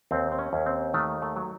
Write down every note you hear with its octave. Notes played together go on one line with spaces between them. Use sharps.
D#2 C4
C4
C#4
D#2
C4
D#3 A3
A3
F#3